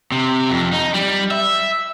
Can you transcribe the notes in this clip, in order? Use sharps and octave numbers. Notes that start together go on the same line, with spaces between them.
C3
F2
D#4
G3
E5